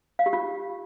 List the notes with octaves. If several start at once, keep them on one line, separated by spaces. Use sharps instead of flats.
F5
G4
F4